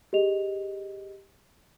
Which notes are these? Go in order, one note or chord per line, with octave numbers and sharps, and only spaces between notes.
G4 G#4 D#5 F7